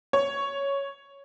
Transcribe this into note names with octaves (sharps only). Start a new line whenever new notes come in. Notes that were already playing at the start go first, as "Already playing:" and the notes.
C#5